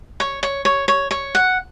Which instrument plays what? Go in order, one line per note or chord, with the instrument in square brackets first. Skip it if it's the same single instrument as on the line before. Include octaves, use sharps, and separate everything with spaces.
[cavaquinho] C#5
C#5
C#5
C#5
C#5
F#5